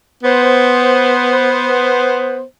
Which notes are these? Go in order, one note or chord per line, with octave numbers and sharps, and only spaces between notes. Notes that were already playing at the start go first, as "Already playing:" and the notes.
B3 C5